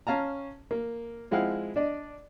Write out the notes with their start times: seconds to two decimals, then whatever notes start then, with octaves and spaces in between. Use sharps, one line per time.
0.07 C#4 F5 A5 A#5
0.71 A#3
1.31 F3 G#3 C4 E4 F5 F#5
1.76 D4 D5 D#5